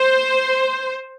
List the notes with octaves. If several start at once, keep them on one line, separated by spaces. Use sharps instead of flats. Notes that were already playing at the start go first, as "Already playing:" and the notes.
Already playing: C5